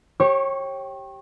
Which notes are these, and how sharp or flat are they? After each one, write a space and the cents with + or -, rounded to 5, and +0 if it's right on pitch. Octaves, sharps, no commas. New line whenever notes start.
G4 -5 C#5 -30 C#6 +0